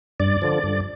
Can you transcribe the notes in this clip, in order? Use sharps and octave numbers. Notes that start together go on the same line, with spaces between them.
G2 D5
D3 F3
G2